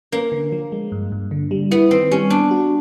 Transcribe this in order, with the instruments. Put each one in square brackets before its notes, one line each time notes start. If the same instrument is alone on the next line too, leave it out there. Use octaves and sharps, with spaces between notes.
[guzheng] A#3 [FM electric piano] C#4
[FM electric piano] D3
F3
G#3
G2
G2
D3
G3
[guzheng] B3 [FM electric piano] E4
[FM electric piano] D#3 [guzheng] C4
[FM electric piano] G3 [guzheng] C#4
[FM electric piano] B3 [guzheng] D4
[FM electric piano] F#4